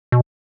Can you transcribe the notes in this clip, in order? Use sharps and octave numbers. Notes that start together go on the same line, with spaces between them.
B2